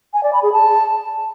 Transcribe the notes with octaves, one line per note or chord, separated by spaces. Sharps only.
G#5
D5
B5
G#4
A5